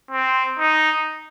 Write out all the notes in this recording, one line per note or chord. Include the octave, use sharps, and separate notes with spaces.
C4
D#4